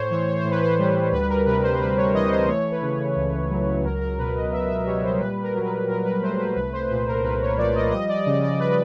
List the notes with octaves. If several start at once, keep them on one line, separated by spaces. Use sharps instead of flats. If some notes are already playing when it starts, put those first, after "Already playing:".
Already playing: A2 C5 C#5
E3 C#5
C#5
C5
A2
B4
C5
G3
D2 B4
A#4
C3 B4
C5
D2 B4
C#5
E3 D#5
C5
A3 C#5
B4
C#3
C#2
F#3
C#2 A#4
A#4
B2 B4
D#5
C#2 E5
E5
G3 C#5
C5
A#2 B4
A#4
F#3
B4
A#2 A#4
B4
A3 C5
B4
C2 B4
C5
A#2 B4
A#4
C2 B4
C#5
F3 D5
D#5
G3 D#5
D5
C#3 D#5
D5
B4